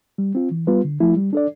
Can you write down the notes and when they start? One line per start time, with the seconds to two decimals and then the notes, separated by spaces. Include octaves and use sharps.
0.18 G3
0.35 C4 F4
0.51 E3
0.67 G3 B3 F4 B4
0.84 D3
1.00 F3 A3 E4
1.16 G3
1.33 D4 A4 D5